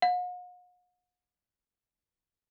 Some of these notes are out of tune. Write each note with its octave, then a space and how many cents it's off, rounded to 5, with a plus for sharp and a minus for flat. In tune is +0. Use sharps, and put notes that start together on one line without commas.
F#5 -45